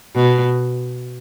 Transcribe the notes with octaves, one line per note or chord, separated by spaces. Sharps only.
B2